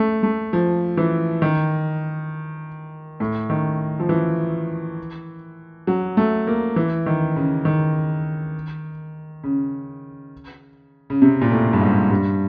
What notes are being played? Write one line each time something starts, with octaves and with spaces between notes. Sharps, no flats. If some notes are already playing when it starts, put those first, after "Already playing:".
Already playing: A3
A3
F3
E3
D#3
A2
D#3
F3
E3
F#3
A3
A#3
E3
D#3
C#3
D#3
C#3
C#3
C3
A#2
A2
G2
G#2
G2